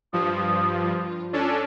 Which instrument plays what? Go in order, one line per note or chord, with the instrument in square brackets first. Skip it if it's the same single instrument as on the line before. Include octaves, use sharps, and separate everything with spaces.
[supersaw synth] G2 F3 [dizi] D#6
[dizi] F4
[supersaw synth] C#4 D4 A4